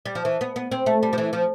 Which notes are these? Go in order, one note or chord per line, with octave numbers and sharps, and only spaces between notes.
G3
F3
E3
B3
B3
C4
A3
G3
F3
E3
F3